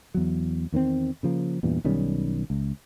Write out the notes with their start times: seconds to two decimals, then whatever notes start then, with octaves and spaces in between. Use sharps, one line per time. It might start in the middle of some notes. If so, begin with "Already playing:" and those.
0.14 E2 F#3
0.72 E2 D#3 B3 C4
1.23 C#3 F3 A#3
1.63 E2 G2 A#2 E3
1.84 B1 D#3 G3 C#4
2.50 C#2